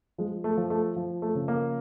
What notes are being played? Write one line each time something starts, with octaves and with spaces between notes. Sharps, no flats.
F3 G#3
A3
F3
A3
F3
A3
C#3
A#3